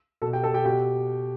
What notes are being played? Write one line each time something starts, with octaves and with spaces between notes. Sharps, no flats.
B2 A4 A5
G4 G5
A4 A5
G4 G5
B2 G4 G5